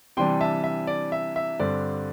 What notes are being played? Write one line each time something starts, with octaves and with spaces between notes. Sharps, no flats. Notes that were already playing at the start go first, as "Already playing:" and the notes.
C3 E3 G3 D4 G5 C6
E5 A5
E5
D5
E5
E5
G2 D3 C4 D5